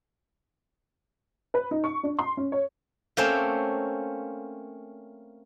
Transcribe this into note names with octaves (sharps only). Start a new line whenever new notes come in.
B4
D#4
C#6
D4
C6
C#4
C#5
A3 A#3 C4 C#4 C5